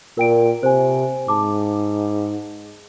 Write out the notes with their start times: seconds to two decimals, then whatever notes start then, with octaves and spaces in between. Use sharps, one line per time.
0.17 A#2 A#4 G5 D7
0.63 C3 C5 G#5
1.28 G#2 A5 D6